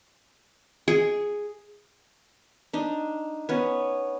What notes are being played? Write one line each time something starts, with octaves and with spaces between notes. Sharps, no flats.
G#4
D4 D#4
B3 C#4